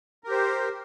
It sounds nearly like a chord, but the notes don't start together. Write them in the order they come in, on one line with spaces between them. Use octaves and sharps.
A#4 G4 C5